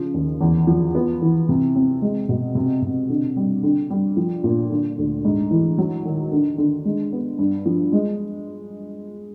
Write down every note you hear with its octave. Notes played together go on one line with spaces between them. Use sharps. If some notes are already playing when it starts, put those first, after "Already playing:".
Already playing: C#3 F3
D#2
E2
F3
B3
E3
C3
C4
G#3
B2
C3
C3
D3
G3
D3
G3
F3
A#2
D3
D2
G#2
E3
F#3
D#3
D3
D3
G#3
B3
G2
F3
G#3